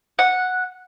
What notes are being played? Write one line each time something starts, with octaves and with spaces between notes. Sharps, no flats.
F#5